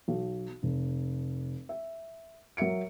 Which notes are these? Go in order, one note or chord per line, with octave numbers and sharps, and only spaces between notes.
B1
F1
E5
F#3 A#4 E5 C#7 D7